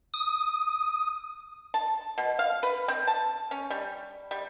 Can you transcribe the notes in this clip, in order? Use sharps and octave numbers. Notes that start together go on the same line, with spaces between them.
D#6
A5
B2
F5
B4
C4
A5
C#4
G3
G3